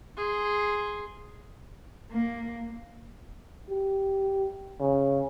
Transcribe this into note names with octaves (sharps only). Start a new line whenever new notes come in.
G#4 C6
A#3
G4
C#3